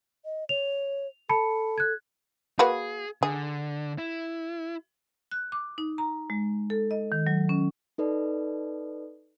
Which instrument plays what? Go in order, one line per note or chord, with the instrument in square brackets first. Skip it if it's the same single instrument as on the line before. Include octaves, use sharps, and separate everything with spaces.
[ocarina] D#5
[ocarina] C#5 [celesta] F7
[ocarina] A4 [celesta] A5 B5 C#7
[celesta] F#6 G#6
[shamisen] A#3 F#4 B4 [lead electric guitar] G#4
[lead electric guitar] D3 [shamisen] G#4
[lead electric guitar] E4
[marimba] F#6
D6
D#4
A#5
G#3
A4
D#5
D#3
F#3
C#4
[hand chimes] D#4 A4 B4 D5